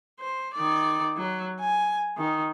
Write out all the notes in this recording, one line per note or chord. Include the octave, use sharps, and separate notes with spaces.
C5
D#3 D5
F#3
G#5
D#3